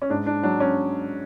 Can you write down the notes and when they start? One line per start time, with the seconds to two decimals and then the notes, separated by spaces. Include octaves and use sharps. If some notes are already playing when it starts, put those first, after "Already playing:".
0.02 C#4
0.10 G#2 D4
0.26 D4
0.43 F#3 D4
0.60 C#4